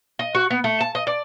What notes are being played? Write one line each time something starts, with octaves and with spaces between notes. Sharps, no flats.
D#5
F#4
B3
A3
A5
D#5
D5